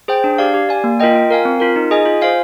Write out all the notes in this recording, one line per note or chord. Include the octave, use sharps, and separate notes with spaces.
G#4 C5 G5
D4
G4 D5 F5
G4
D5 G#5
A#3
F4 A#4 D#5 G5
F4
A#4 F5 G#5
C4
F4 A#4
D#4
G#4 D#5 G#5
F4
C5 F5 G#5